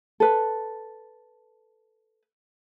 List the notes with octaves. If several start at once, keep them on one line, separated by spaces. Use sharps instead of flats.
A4 B4